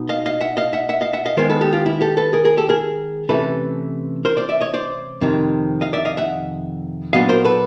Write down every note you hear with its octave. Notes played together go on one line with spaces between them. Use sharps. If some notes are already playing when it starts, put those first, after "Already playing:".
Already playing: B2 D#4
D#5 F5
D#5 F5
E5 F#5
D#5 F5
E5 F#5
E5 F#5
D#5 F5
E5 F#5
D#5 F5
D#3 G#3 B3 A#4 C5
A4 B4
G4 A4
F4 G4
E4
G4 A4
A4 B4
G#4 A#4
G#4 A#4
G4 A4
G#4 A#4
C3 E3 A3 C#4 A4 B4
A#4 C5
C5 D5
D5 E5
C#5 D#5
C5 D5
F2 C3 D#3
D#5 F5
D5 E5
D#5 F5
E5 F#5
A#2 F#3 B3 D4 D#5 F5
A#4 C5
A4 B4